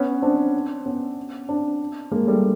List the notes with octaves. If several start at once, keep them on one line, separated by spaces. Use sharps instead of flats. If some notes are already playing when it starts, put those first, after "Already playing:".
Already playing: B3 C#4
C4 D4
B3 C#4
C4 D4
G#3 A#3
G3 A3